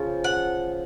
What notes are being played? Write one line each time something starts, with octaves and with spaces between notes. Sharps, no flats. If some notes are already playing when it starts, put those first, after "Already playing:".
Already playing: C#3 F3
F#5